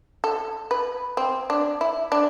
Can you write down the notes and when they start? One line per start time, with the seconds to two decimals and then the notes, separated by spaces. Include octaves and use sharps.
0.24 A4
0.71 B4
1.17 C4
1.50 D4
1.81 E4
2.12 D4